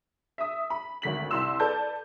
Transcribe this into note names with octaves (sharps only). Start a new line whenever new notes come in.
E5 D#6
B5
G#1 D2 B6 F#7
C2 C6 E6
A4 B4 D5 A5 G6